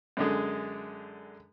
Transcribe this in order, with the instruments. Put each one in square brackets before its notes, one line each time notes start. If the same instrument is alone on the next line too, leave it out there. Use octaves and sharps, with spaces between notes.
[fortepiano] F#2 D3 G#3